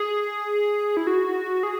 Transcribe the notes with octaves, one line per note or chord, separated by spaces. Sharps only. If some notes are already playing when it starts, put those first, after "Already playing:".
Already playing: G#4
E4
F#4
G#4